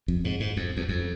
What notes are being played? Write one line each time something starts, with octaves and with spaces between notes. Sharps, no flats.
F2
G#2
G#2
F2
E2
F2